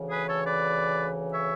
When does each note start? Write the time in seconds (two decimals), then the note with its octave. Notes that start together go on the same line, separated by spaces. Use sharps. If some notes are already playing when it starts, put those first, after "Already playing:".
Already playing: D2 C#3 E3
0.10 G#4 B4
0.28 A4 C#5
0.45 B4 D5
1.33 C#5 E5